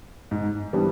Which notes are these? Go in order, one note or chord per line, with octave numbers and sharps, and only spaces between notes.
G#2
E3 G3 B3 D4